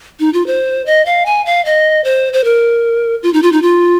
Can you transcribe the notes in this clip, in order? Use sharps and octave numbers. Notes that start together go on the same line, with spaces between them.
D#4
F4
C5
D#5
F5
G#5
F5
D#5
C5
C5
A#4
F4
D#4
F4
D#4
F4